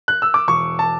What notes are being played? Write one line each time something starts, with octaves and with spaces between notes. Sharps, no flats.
F#6
E6
D6
E1 C#6
A5